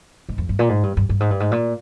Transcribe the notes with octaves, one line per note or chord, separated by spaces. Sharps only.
G#2
F2
G2
A#2
G#2
G2
G2
G2
G#2
G2
G#2
A#2